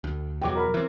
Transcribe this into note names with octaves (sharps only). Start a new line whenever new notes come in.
D2
E2 B2 F#3 G5 D6
A#4 A#5 B5
E3 C4